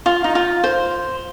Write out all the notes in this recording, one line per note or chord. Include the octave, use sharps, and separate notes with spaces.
F4
D#4
F4
C5